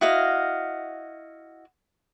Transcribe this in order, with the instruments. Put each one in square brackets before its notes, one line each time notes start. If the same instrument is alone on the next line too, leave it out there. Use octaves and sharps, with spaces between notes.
[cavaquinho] E4 F#4 D#5 F5